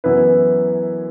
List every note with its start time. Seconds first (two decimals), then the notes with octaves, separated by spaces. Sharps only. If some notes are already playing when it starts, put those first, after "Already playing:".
0.04 F#2 E3 B3 E4 B4